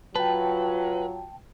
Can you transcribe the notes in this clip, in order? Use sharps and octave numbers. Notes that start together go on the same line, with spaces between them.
F#3 F4 B4 G5 A5